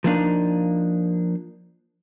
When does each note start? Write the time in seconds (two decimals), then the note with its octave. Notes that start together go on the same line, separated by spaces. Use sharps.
0.04 F3 A#3 D4 D#4